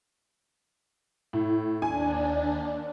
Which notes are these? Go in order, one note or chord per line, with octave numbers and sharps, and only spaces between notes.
A2
D#2 D4 G#5